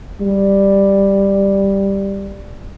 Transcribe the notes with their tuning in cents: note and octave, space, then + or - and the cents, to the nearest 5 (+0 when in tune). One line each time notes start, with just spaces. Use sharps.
G3 +5